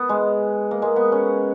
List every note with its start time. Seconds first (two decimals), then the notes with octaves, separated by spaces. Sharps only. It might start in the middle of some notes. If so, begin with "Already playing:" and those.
Already playing: B3
0.09 G#3
0.71 A#3
0.82 G#3
0.96 B3
1.12 C#4